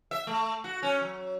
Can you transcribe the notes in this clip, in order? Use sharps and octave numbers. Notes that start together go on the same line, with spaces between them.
E5
A3
F#4
C#4
F#3